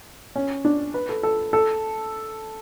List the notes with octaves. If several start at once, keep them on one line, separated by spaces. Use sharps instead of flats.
C#4
D4
B4
A4
A4
A4